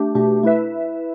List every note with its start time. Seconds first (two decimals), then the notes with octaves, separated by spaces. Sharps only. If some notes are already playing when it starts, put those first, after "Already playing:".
Already playing: A3 D4 G4
0.15 B2 A3 D4 G4
0.43 A3 E4 B4 E5